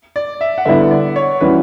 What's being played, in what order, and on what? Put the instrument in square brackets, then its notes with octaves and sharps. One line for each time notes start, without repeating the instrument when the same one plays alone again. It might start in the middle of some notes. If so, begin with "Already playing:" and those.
[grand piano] D5
E5
F#5
[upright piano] D3 G3 B3 E4 [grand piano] E5
[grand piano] D5
C#5
[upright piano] E3 G3 C#4 F#4 [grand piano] B4